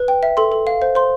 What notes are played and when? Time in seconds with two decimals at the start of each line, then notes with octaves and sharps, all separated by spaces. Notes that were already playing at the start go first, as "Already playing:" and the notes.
Already playing: B4
0.08 G5
0.23 E5
0.37 A4 C6
0.52 A4
0.67 F5
0.82 C5
0.95 C5 C6